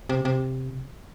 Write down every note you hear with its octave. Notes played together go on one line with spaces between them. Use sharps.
C3
C3